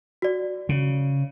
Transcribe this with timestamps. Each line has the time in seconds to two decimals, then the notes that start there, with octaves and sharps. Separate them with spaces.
0.22 F#4 D5
0.69 C#3